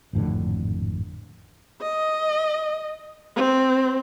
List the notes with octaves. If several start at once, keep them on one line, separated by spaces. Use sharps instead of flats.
G#1 F2 A2 D3
D#5
C4